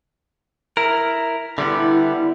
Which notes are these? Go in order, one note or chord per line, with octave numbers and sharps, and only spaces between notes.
E4 A#4
D3 G3 B3 E4